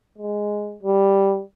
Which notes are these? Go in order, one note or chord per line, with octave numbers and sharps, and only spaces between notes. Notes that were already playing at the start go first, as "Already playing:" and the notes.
G#3
G3